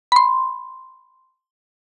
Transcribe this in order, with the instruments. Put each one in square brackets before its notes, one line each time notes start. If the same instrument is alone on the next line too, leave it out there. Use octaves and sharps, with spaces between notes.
[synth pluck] B5 C6